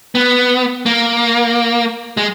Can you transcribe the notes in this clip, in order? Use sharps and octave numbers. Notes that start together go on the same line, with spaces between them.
B3
A#3
G#3